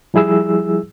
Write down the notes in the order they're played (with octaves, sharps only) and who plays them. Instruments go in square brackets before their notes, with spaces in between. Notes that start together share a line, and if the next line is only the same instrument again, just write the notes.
[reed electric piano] F3 G3 E4 G#4 E6